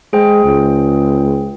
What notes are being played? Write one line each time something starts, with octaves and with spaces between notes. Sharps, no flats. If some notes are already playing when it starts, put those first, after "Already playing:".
G#3 G#4 C5 G5
C#2